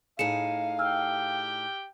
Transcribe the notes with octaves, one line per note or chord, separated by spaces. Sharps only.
A2 D#4 G#4 F5 C#7 E7
G4 G5 E6 F6